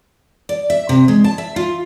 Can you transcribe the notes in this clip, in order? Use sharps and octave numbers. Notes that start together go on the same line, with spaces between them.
D5
E5
C3
G#3
A5
E5
F4